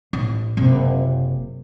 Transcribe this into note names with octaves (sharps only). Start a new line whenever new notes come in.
A1
F#1 C3